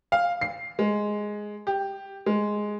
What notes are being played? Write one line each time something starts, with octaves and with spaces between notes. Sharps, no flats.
F5
C7
G#3
G4
G#3